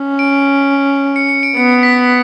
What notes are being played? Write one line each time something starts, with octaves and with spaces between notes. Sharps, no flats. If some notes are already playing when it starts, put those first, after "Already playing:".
Already playing: C#4
D7
C#7
C#7
D7
B3 C#7
B6